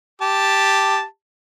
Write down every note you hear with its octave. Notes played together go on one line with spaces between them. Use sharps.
G4 A5